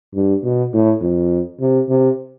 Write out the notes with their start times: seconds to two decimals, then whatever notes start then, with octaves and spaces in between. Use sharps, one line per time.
0.15 G2
0.44 B2
0.74 A2
1.01 F2
1.60 C3
1.89 C3